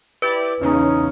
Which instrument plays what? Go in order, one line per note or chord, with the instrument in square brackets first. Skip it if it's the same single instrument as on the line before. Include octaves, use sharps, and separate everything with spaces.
[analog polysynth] E4 G4 D5 [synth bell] B4
[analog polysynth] E2 C#3 [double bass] C#4 [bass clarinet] D#4